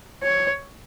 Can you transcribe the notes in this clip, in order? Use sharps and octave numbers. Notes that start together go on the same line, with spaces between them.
C#5